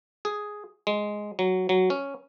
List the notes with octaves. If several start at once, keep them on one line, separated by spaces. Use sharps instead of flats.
G#4
G#3
F#3
F#3
C#4